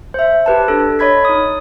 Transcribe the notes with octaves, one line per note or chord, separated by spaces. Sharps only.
C5 E5
G4 B4 A5
D4 A4
C#5 D#5 B5 G#6 B6
D#4 D#6